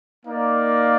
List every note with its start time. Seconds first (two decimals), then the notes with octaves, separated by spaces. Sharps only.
0.25 A#3 D#4 A#4 D5 F5